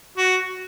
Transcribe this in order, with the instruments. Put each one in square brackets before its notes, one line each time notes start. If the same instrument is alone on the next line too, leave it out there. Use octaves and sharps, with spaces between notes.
[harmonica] F#4